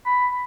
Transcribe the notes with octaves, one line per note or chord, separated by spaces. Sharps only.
B5